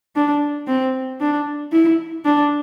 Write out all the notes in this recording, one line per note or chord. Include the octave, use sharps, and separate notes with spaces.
D4
C4
D4
E4
D4